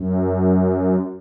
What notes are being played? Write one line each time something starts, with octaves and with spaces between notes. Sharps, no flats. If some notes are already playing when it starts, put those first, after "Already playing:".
Already playing: F#2